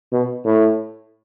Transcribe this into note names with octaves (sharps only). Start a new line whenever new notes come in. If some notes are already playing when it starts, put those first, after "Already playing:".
B2
A2